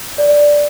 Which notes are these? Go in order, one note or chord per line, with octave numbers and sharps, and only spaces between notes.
D5